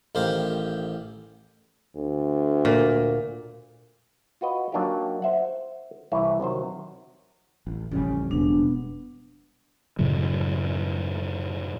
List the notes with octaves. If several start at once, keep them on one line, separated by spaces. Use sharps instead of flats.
A1 D#3 G4 C5 F5
D2
A#2
F4 F#4 B4 D#5
F#3 A#3 D4 D#4 F4 G4
C5 E5 F#5
C2 E3 G3 E4 C#5 E5
C3 D#3 F#3 C5
A1
A1 F2 C#3 G3 C#4
E1 B3 D4
F#2 A2 C#3 F#3